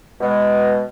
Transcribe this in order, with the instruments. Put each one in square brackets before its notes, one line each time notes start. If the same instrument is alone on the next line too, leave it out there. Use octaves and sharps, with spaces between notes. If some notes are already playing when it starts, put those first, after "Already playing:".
[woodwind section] B2 G#3